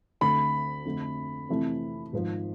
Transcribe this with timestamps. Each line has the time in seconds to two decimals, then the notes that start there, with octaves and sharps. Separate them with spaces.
0.21 D2 D3 A3 C4 B5
0.85 F2 D3 A3
1.49 F2 C3 E3 A3
2.13 G#1 G#2 F3